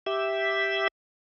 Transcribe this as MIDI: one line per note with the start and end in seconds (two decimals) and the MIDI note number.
0.06 0.88 67
0.06 0.88 76